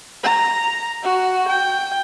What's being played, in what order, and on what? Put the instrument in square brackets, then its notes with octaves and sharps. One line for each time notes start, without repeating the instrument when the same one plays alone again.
[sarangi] A#5
F#4
G5